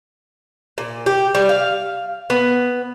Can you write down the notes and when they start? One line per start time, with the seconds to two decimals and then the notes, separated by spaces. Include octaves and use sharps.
0.78 A#2
1.06 G4
1.35 G3
1.49 F5
2.30 B3